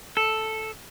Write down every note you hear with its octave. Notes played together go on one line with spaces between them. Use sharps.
A4